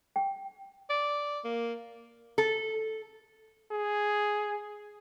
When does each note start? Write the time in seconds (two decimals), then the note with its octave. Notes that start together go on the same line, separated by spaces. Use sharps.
0.16 G5
0.90 D5
1.44 A#3
2.38 A4
3.72 G#4